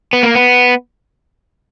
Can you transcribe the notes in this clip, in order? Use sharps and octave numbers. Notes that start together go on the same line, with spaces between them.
B3
A#3
B3